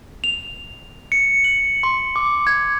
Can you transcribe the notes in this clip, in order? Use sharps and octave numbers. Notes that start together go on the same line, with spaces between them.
F7
C#7
F#7
C6
D6
G#6